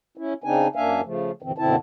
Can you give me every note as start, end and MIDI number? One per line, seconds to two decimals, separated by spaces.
0.17 0.33 61
0.17 0.33 64
0.44 0.67 49
0.44 0.67 60
0.44 0.67 62
0.44 0.67 63
0.44 0.67 80
0.75 1.01 42
0.75 1.01 58
0.75 1.01 62
0.75 1.01 76
0.75 1.01 77
0.75 1.01 80
1.04 1.31 49
1.04 1.31 53
1.04 1.31 57
1.42 1.52 42
1.42 1.52 46
1.42 1.52 50
1.42 1.52 52
1.42 1.52 60
1.58 1.76 42
1.58 1.76 47
1.58 1.76 50
1.58 1.76 60
1.58 1.76 64
1.58 1.76 81